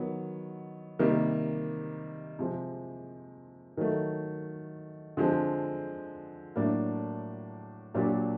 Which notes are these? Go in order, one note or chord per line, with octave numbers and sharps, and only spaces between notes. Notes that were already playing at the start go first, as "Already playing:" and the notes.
Already playing: D#3 F#3 B3
C3 D#3 G3 A#3
C3 F3 G#3
D#3 F#3 A3
D3 F3 G#3 C4
A2 F#3 A#3 D4
A#2 F#3 A#3 D4 G4